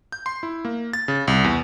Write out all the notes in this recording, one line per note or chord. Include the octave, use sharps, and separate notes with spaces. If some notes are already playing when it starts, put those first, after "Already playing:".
G6
C6
E4
A#3
A6
C#3
C2
E2